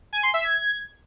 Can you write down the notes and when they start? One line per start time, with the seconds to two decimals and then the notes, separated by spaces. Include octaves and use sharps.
0.13 G#5
0.23 C6
0.34 E5
0.44 G#6